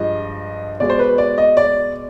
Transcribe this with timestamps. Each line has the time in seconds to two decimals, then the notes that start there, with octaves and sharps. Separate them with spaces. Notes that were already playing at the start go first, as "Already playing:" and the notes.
Already playing: G2 F3 G#3 D#5
0.80 B2 G#3 D5
0.90 C5
0.99 B4
1.18 D5
1.38 D#5
1.57 D5